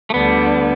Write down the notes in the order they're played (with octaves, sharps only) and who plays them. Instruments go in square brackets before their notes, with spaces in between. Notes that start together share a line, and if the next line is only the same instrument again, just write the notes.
[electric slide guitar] A3
[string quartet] D2 D3 G3 D4 [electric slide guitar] B3